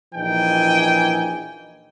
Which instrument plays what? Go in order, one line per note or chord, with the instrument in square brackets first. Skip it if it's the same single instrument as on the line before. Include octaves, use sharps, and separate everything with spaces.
[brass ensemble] A#1 E3 D#4 G5 G#5